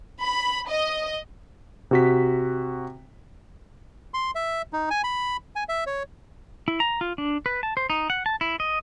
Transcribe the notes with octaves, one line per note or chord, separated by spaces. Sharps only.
B5
D#5
C3 F#4 B6
C6
E5
D#4
G#5
B5
G#5
E5
C#5
E4
A#5
F4
D4
B4
A5
C5
D#4
F#5
A5
E4
D#5